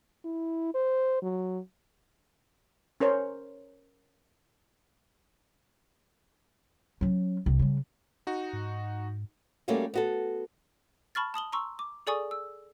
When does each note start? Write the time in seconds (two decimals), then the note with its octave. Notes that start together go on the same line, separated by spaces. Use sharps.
0.25 E4
0.75 C5
1.22 F#3
3.00 C#4 A#4 C5 C#5
7.01 F#3 C#4
7.46 C2
7.59 C#3 G3
8.27 D#4 F#4
8.53 G#2
9.68 G3 A3 A#3 C#4 F#4
9.94 B3 F#4 A4
11.15 A5 B5 C#6 F6 A6
11.34 A5 D#6 F#7 G7
11.52 A#5 C6 C#6 E6
11.79 D6
12.07 G#4 A4 D5 G#5 C#6 D#6
12.31 E6